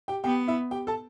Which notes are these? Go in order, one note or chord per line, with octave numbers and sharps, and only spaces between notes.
G4 G5
B3 G4 G5
E4 E5
G4 G5
A4 A5